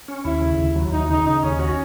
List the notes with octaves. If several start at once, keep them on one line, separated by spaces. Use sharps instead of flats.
C#4
D#2 E4
C#3
D#2
F#3
D#2 D#4
C#3 D#4
C#3 D#4
D#2 C#4
C#4 F#4